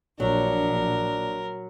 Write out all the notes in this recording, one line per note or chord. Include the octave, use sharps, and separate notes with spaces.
A#1 F#3 D4 A#4